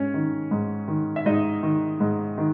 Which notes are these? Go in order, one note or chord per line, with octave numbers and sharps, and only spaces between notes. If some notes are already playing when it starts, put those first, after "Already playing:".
Already playing: G#2 C#4 C#5
D#3
G#2
D#3
E5
G#2 D#4 D#5
D#3
G#2
D#3